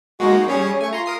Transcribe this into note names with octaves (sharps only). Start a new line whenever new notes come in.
G#3 A#3 D#4 F#4
G3 C#4 G#4 C#5
A3 G#5 C#6
F4 A#5 C6
A#4 D#6 C7